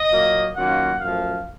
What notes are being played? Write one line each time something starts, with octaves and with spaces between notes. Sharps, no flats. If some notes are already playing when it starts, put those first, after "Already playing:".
Already playing: D#5
A#2 F#3 A#3
D#3 F#3 A#3 C#4 F4 F#5
F#2 F3 A3 F5